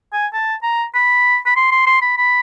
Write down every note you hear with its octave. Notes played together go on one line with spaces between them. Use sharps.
G#5
A5
A#5
B5
B5
C6
C6
C6
B5
B5